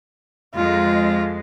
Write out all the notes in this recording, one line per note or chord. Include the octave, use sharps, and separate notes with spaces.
F2 G#3 F4